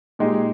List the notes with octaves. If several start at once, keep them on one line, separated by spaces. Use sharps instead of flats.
A#2 G#3 D#4 G4